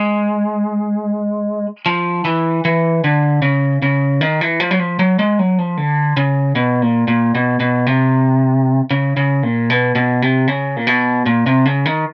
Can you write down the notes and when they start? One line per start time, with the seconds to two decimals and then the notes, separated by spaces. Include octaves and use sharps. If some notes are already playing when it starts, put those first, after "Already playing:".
Already playing: G#3
1.86 F3
2.25 E3
2.65 E3
3.04 D3
3.42 C#3
3.82 C#3
4.21 D#3
4.41 E3
4.60 F3
4.71 F#3
4.79 F3
4.99 F#3
5.19 G#3
5.39 F#3
5.59 F3
5.77 D3
6.17 C#3
6.55 B2
6.82 A#2
7.08 A#2
7.35 B2
7.60 B2
7.86 C3
8.91 C#3
9.17 C#3
9.43 A#2
9.70 B2
9.95 B2
10.22 C3
10.48 C#3
10.77 A#2
10.87 B2
11.26 A#2
11.46 C3
11.65 C#3
11.86 D#3